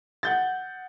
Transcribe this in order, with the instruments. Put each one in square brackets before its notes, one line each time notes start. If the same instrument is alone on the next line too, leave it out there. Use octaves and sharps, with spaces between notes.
[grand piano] F#5 G6 A6